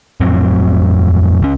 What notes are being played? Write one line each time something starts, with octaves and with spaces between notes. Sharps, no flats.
F2 A2 F#3 C4
C#2 C#4